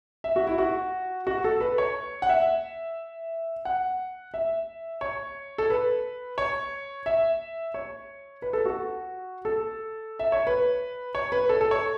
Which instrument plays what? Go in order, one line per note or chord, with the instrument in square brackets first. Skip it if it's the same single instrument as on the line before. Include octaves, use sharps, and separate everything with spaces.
[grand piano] E5
F#4
E4
F#4
F#4
A4
B4
C#5
F#5
E5
F#5
E5
C#5
A4
B4
C#5
E5
C#5
B4
A4
F#4
A4
E5
C#5
B4
C#5
B4
A4
A4
C#5